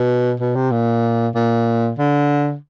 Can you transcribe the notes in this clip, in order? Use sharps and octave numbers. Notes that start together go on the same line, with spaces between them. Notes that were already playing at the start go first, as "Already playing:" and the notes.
Already playing: B2
B2
C3
A#2
A#2
D3